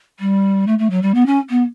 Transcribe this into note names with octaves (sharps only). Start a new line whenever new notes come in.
G3
A3
A3
F#3
G3
B3
C#4
B3